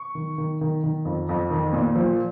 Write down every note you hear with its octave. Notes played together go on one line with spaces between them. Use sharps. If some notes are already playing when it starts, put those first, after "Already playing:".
Already playing: C#6
D#3
D#3
D#3
D#3
F2
F2
D#3
A#2
F3